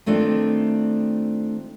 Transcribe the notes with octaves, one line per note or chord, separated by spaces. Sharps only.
D#3 A3 C4 D4 F4